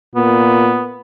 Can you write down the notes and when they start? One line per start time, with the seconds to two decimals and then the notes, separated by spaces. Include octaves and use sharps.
0.16 A#2 B3